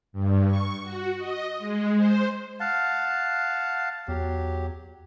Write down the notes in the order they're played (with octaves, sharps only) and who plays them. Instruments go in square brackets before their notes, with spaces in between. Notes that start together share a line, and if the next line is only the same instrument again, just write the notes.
[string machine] G2
C#6
F#4
D#5
G#3
C5
[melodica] F5 F#5 A5
[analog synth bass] E2 [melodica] F#3 G4